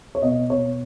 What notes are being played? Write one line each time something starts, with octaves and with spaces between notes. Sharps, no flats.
C#5
B2 D#5
B2 C#5